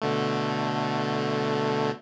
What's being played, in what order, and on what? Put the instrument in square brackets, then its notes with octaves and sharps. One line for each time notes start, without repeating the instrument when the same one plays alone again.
[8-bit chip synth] B2 D3 A3